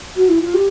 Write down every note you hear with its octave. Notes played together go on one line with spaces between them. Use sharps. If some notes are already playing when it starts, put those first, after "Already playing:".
F#4
E4
F4
G4